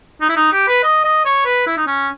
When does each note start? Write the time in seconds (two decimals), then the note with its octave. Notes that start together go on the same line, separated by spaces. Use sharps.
0.21 D#4
0.29 E4
0.36 D#4
0.53 G4
0.68 B4
0.84 D#5
1.05 D#5
1.25 C#5
1.45 B4
1.67 E4
1.77 D#4
1.87 C#4